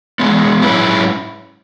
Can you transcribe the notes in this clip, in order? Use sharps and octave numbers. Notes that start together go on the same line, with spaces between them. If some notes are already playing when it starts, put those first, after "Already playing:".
E2 C#3 G#3 B3
G#2 F#3 C#4 E4 B4